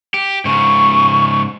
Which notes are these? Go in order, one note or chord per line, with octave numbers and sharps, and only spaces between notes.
G4
G#2 C#3 C#6